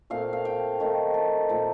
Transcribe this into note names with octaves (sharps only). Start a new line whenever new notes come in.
A#2 A3 C4 F5
F5
G5
D#3 A3 D#4
A5
A#2 F3 A3 D#4